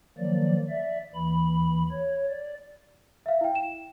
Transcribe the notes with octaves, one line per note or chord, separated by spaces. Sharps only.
D#3 F3 F#3 A#3 D5
D5 E5
D#2 E3 B5
C#5
D5
E5 F5
E4 G5
E7